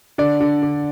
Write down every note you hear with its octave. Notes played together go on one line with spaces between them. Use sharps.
D3 D5
D3
D3